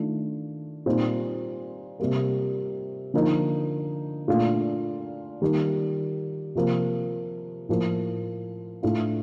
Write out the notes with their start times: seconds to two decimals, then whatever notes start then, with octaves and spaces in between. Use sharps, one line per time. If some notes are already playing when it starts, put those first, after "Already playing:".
Already playing: D#3 A3 D4 F4
0.86 A#2 G3 C4 D#4
2.00 C3 G3 A#3
3.14 D3 F3 A#3 D#4
4.28 A#2 A3 D4 F4
5.42 D#3 G3 A#3
6.55 C3 F3 A#3
7.69 A2 F3 A#3 F4
8.83 A2 A3 D4 F4